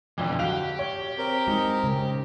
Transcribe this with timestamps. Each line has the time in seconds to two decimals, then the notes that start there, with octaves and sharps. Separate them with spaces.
0.18 B1 F2 D3 E3
0.39 F#4 G4 F5 F7
0.79 C#5
1.18 C4 A#4
1.48 G#3 D#4
1.84 C#3